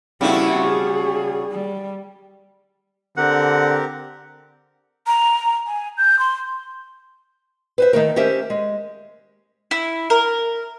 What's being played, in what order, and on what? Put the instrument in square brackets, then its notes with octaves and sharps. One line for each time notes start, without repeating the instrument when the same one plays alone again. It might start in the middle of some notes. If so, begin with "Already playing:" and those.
[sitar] C#3 A3 F#4 [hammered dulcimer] G3 [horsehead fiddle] C4 E4
[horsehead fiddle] G#4
G3
[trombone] D3 [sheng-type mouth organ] C4 G4 A#4 [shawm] F#5
[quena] A#5
G#5
G6
C6
[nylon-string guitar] B4 C5 E5
D#3 A3 A#4
C#4 G4 A#4 C5 E5
G#3
[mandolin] E4
A#4